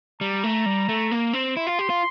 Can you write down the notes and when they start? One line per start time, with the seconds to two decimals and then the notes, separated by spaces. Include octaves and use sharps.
0.21 G3 A#5
0.43 A3
0.66 G3
0.89 A3
1.11 A#3
1.33 C4
1.56 E4 C6
1.67 F4
1.79 G4
1.90 F4